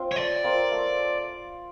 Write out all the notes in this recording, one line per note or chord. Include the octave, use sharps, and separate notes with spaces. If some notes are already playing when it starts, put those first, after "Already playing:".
Already playing: C4 F4
C#5
A3 D5
C4 F4 A#4
A3